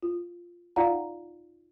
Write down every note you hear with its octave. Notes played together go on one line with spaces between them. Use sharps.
F4
D#4 F4 D5 F5 F#5 A#5